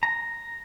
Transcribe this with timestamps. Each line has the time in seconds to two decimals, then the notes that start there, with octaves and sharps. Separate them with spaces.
0.03 A#5